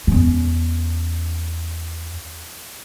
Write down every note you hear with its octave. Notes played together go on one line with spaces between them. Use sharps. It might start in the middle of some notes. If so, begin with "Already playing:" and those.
E2 C#4